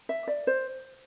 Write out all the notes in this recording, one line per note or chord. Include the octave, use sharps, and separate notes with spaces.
E5
D5
C5